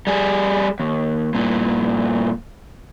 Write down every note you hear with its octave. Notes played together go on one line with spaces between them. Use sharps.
G3 G#4
D#2
G2 A#2